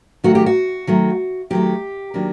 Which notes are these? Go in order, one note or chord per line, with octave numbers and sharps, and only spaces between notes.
D#3 F#3 A3 F#4
G4
F#4
D#3 F#3 A3
D#3 F#3 A3 G4
D#3 F#3 A#3 D4